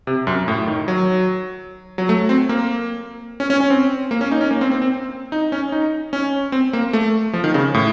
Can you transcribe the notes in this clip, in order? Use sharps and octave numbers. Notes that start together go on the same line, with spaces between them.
C3
F#2
A2
D#3
F#3
F#3
A3
C4
A#3
C#4
C#4
C#4
C4
A#3
C#4
D#4
C#4
A#3
C4
C4
C4
D#4
C#4
D#4
C#4
C4
A#3
A3
F3
D#3
C#3
A2